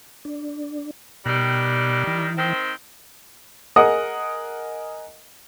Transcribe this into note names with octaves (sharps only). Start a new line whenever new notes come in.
D4
B2 D#3 G3 F#6
E3
D#3 C4
G#4 A#4 D#5 F#5 D#6